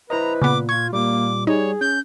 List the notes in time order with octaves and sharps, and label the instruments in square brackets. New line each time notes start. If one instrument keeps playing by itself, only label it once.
[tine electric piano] E4 C5 D#5 [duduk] B4 [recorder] A#5
[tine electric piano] A#2 [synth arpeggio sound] C#3 B3 [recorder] D6
[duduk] F4 [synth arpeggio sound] C#6 [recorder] G#6
[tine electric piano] A#2 G3 [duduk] A#3 [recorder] D6
[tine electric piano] G3 [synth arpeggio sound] D#4 [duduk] G#4 [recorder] C#5
[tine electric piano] C#4 [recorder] G6